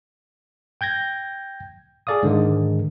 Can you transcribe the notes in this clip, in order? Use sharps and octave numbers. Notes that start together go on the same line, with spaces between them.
G5 G6 G#6 A#6
G#4 A4 D5 F5 D#6
G#2 D3 D#3 G#3